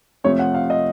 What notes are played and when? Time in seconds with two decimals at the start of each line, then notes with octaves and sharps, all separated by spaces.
0.24 F2 C3 F3 A3 C#5
0.39 F#5
0.54 F5
0.70 D#5